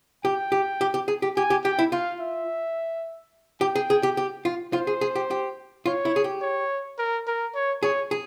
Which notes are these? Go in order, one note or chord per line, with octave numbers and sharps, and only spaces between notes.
G4 G5
G4
G4
G4
G#4
G4
G4 G#5
G4
G4 G5
E4
F4 F5
E5
G4 G5
G#4
G#4
G4
G4
F4
F4 C5
G#4
G#4
G4
G4
F4 C#5
E4
G#4
G4
C#5
A#4
A#4
C#5
G#4 C#5
G#4